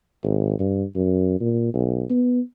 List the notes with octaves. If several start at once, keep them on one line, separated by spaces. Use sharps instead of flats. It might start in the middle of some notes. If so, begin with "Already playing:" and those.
G#1
G2
F#2
A#2
B1
B3